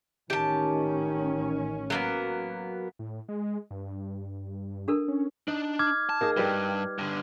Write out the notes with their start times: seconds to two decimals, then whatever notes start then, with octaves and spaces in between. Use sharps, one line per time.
0.30 A1 D#3 C#4 G4 A5
1.90 F#3 A#3 B3
2.99 A2
3.29 G#3
3.71 G2
4.88 D4 A4 A#4
5.08 C#4
5.48 D4 D#4
5.79 D6 F6 G#6
6.09 A5
6.21 A#3 D#4 G#4
6.37 G2 G3 B4
6.98 G2 D3